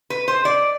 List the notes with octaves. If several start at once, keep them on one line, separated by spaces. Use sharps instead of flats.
B4
C5
D5